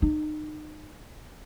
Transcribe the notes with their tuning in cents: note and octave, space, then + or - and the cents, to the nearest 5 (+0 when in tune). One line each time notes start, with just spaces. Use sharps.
D#4 -30